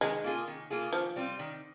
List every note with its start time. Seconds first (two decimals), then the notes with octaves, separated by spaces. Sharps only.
0.01 D#3 G#3
0.24 A#3 F4 G#4
0.47 D#3
0.70 A#3 F4 G#4
0.93 D#3 F3
1.16 G3 C4 F4
1.39 D#3